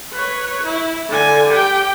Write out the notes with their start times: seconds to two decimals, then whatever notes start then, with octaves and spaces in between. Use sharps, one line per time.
0.13 B4 C#5
0.63 E4
1.08 D3 G#5
1.49 G4 G5